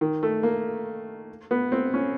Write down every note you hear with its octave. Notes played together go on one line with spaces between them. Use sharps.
D#3
A3
A#3
B3
C4
C#4